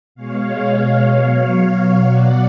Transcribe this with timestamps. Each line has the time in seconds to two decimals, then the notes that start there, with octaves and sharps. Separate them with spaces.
0.15 B2 G#3 C#5 F5
1.11 B2 F#3 C#5 F5
2.07 B2 F#3 D5 F#5